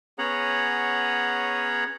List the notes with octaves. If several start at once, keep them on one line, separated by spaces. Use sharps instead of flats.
B3 C#4 G#4 C#5 F#5 A#5